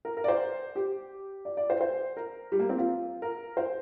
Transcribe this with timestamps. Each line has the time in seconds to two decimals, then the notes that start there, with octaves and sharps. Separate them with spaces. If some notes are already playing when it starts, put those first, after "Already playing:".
0.05 A#4
0.17 A#4
0.24 D5
0.28 C5
0.75 G4
1.45 D5
1.57 D5
1.70 C5
1.81 C5
2.17 A#4
2.52 G3
2.59 A#3
2.69 C4
2.78 F4
3.22 A#4
3.57 C5